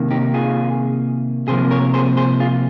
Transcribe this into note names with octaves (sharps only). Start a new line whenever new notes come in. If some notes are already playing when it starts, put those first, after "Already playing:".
Already playing: C3 D#3 A#3
D#4 G4
F4 G#4
C3 F3 A#3 G#4 C5
A#4 C#5
G#4 C5
G#4 C5
F4 G#4